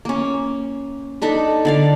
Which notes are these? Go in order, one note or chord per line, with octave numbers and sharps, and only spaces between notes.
A#3 C#4
D4 D#4 A4 B4
D3 D5 F5